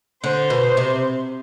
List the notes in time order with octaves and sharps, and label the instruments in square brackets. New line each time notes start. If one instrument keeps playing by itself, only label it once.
[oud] D3 [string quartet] C5
[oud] B2
C3